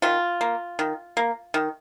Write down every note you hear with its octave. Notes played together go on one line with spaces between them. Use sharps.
D#3 F4
A#3
D#3
A#3
D#3